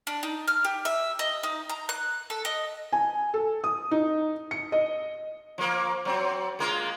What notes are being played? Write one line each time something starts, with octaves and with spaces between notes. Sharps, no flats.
D4
D#4
F6
G4
E5
D#5
D#4
A#5
F#6
A4
D#5
G#5
A4
D#6
D#4
C#7
D#5
F3 A#3
F#3 C4
G#3 A#3 F4